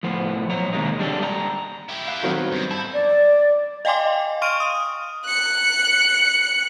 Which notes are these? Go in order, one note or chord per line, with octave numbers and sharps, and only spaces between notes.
A2 F3 B3 C5
B1 C#5 A#5
D#2 C3 G#3 A#3 D#4
G3 D4 G4 A4
G3 D#5 A#5
E4 G4
F5 F#6
D#3 F#3 C4
G3 B3
G2 D#4
E4 A5 A#5 G6
D5
D#5 F5 G5 G#5 C6 D6
F5 C6 C#6 F6 D7 D#7
D#6
F#6 C#7